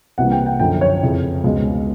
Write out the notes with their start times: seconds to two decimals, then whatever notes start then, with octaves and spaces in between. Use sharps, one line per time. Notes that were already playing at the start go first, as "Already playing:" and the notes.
0.18 C2 C3 E3 G3 A#3 F#5
0.31 G5
0.46 G5
0.59 F#2 D3 F3 G5
0.81 C#5
1.02 F2 C#3 E3
1.44 C#2 B2 G#3